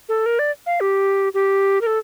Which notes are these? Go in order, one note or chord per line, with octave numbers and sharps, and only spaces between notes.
A4
A#4
D5
F5
G4
G4
A#4
A4